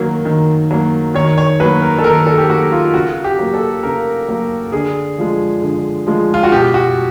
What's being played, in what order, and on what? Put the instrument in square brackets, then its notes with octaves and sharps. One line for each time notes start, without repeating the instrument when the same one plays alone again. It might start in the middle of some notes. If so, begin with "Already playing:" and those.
Already playing: [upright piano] D#3 F#3 A#3
D#3
F#3 A#3
D#3 C#5
C#5
F#3 A#3 B4
A#4
A4
D#3 A#4
A4
G4
F#3 A#3 F#4
F4
C#3 F#4
G4
F#3 A#3
A4
C#3 A#4
F#3 A#3
D3 G#4
F3 G#3
D3
F3 G#3
F4
F#4
B2 G4
F#4